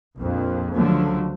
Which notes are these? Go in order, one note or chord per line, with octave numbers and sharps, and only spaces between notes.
A#1 F2
C#2 D3 F3 F#3 A3